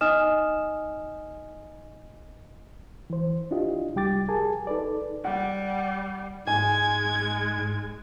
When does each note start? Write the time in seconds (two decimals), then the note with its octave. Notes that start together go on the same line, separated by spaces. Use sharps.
0.01 D#4 D#5 G#5 D#6 F6 E7
3.10 E3 C5
3.51 D4 E4 F4 G4 D#5
3.95 C2 G3 G4 G5 D6 A6
4.28 G4 G#4 A#4 G#5 A5
4.67 D#4 A4 B4 D5
5.24 G3 F#5
6.47 G#2 G#3 G#5 G#6